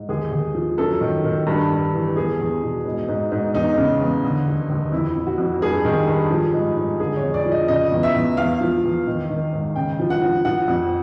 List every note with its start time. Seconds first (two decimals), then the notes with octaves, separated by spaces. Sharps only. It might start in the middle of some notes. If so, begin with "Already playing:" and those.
Already playing: G#2
0.09 D#2 G#4
0.32 D#2
0.55 F3
0.78 F#2 A4
1.01 D#3
1.24 D#3
1.47 G2
1.70 G2
1.94 E3
2.16 E2 G#4
2.39 E2
2.63 B2
2.85 G#2
3.08 G#2
3.32 G#2
3.54 E2 D#4
3.78 C#3
4.00 E2
4.23 D3
4.46 D#2
4.70 D#2
4.92 F2 E4
5.16 F2
5.27 F#4
5.38 F2
5.62 G2 G#4
5.85 D#3
6.08 G2
6.31 F3
6.53 G#2
6.76 G#2
6.99 D3 G#4
7.16 C#5
7.22 F2
7.34 D5
7.46 F3
7.52 D#5
7.68 C#3 D#5
7.92 E2
8.03 E5
8.15 E2
8.37 E2 F5
8.61 F3
8.84 E2
9.07 D#3
9.29 D#3
9.53 G#2
9.76 C#3 G5
10.00 F3
10.10 F#5
10.22 F3
10.45 F3 F#5
10.68 F2